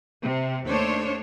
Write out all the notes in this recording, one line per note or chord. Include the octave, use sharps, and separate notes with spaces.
C3
D#2 A3 D4 C5 C#5